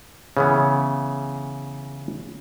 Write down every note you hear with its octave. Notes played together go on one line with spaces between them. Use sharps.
C#3 E3 B3